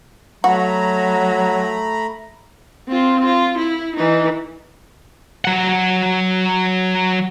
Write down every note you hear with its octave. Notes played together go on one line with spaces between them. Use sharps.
F#3 A3 F#4 A#5 B5
C4 F4
F4
E4
E3 D#4
F#3 F#5